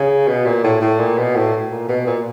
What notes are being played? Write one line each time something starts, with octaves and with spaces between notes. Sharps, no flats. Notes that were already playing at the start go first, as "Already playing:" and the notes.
Already playing: C#3
B2
A#2
A2
A2
A#2
B2
A2
A#2
B2
A#2